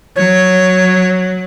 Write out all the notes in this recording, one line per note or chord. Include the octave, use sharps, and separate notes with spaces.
F#3 C#5